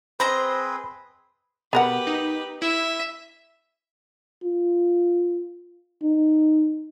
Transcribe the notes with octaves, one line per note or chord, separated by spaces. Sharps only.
C4 G#4 B4 C5 D#5 A#5 B5
B2 B3 G4 A#4 B4 F#5
D#4
E4 E5
F4
D#4